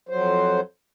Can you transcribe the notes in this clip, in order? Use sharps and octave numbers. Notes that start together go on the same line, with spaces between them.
F2 F#3 C5